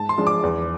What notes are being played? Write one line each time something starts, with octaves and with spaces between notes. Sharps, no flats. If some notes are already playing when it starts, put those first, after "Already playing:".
Already playing: G#2 A5
C6
F3 G#3 D4 F4
D6
E2